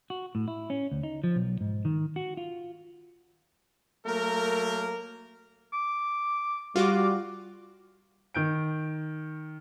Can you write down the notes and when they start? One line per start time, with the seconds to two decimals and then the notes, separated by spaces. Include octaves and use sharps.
0.10 F#4
0.35 A2
0.48 E4
0.70 C#4
0.91 D2
1.03 D#4
1.24 F3
1.36 B1
1.61 G#2
1.85 D#3
2.16 F#4
2.37 F4
4.06 F#3 A3 A#3 A#4
5.73 D6
6.76 G3 F4 F#4 D6
8.34 D#3 G6 D7